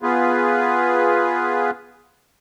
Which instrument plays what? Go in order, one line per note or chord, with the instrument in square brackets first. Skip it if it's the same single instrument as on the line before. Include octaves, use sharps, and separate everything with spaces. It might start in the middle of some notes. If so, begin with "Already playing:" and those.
[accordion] B3 F4 G#4 B4